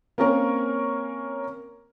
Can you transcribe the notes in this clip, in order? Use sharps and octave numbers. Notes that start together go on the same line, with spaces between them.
A#3 C4 C#4 A#4